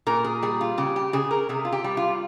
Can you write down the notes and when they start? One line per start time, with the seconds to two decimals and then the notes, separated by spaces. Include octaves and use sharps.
0.07 A#2 A#4
0.24 G#4
0.43 G3 G#4
0.61 F4
0.78 C#3 G4
0.96 G4
1.13 C#3 G#4
1.31 A#4
1.49 C3 G#4
1.65 F4
1.73 G4
1.84 G3
1.97 F4